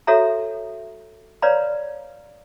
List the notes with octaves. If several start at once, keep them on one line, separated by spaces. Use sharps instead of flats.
F#4 A4 C#5 E5 A#5
B4 C#5 D5 F5 A#5 B5